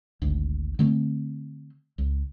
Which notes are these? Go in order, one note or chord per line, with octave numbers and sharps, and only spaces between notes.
G#1 D2
D3 A3 B3 C4
C#2